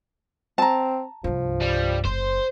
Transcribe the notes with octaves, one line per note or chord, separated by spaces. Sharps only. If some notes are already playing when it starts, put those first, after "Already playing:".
C4 A5 A#5
C2 G2 F3
G3
F#1 C5